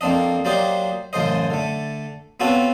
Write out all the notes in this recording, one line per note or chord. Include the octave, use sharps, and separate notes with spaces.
F2 A#3 C4 D4 D#5
F#3 A#3 G4 C5 D5 D#5
A1 F#2 C#3 C5 D#5
D3 A3
B3 C4 F4 F#4 A4 C#5